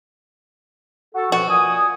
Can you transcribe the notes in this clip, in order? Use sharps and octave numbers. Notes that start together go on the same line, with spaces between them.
F#4 A4
B2 F3 F#4
A#2 G#5 D#6